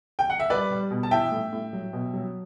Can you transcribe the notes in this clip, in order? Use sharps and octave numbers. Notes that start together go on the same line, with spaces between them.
G5
F#5
E5
G3 B4 D5
G3
B2
A5
E3 E5 G5
A2
A2
F#3
B2
F#3